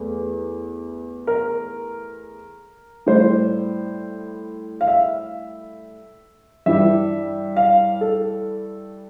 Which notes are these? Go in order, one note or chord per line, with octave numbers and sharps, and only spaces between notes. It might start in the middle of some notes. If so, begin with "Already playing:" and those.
Already playing: E2 A3
A#4
A2 G3 C5
F5
E5
G2 E3 G3 E5
F5
A4